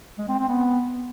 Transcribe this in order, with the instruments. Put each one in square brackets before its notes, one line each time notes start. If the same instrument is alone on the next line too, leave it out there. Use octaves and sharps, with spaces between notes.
[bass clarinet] G#3
C4
C4
B3